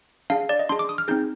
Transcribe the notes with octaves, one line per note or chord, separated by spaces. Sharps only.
D4 G#4 F5
D5
D#5
D4 G#4 C6
D6
D#6
F6
C4 D#4 G#4 G6